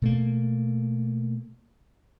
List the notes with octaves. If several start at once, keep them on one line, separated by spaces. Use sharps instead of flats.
B2 A3 A#3